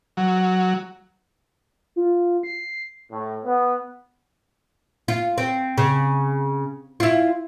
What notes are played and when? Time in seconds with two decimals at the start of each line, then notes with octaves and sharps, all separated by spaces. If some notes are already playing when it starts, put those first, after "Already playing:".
0.17 F#3
1.96 F4
2.43 C7
3.11 A2
3.45 B3
5.08 F4
5.38 C4
5.78 C#3
7.00 E4 F4